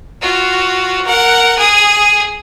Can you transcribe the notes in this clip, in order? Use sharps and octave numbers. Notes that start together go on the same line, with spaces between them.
F4 F#4
A#4 F#5
G#4 D#6